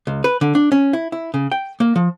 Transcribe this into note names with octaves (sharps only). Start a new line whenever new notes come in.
C#2
B4
D3
D4
C#4
E4
E4
C#3
G5
A#3
F3